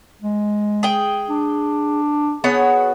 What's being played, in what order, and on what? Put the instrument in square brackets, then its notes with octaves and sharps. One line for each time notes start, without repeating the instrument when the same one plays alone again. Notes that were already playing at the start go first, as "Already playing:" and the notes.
[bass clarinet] G#3
[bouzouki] G#4 G5
[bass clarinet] D4
[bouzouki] B3 F#4 C#5 [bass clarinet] G#4